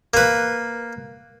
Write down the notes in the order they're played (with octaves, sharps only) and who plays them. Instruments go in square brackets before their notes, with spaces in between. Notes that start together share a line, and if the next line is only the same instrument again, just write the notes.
[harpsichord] A#3 B4